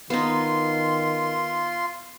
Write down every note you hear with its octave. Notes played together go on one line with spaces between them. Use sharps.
D#3 B3 D#4 F4 C6